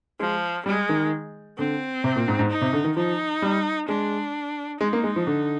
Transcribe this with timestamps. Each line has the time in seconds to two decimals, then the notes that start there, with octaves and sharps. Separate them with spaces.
0.20 F3 G#3
0.66 G3 G#3
0.89 D#3
1.58 D3 C4
2.04 C3
2.16 A#2
2.28 G#2
2.39 G#2
2.50 D#4
2.62 C3
2.73 D3
2.84 D#3
2.96 F3 D#4
3.42 G3
3.88 G#3 D4
4.81 G#3 D#4
4.93 A#3
5.04 G#3
5.16 F3
5.27 D3